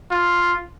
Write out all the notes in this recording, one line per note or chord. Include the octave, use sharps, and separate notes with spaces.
F4